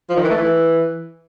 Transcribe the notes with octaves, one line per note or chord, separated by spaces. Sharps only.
F3
D#3
E3
A3
E3